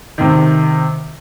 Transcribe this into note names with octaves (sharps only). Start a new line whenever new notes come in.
C3 D#3